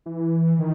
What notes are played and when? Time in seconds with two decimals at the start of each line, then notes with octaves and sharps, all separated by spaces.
0.06 E3
0.59 D#3